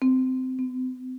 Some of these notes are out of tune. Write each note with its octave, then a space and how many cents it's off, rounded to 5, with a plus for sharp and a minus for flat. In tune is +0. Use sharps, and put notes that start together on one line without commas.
C4 -20
C4 -45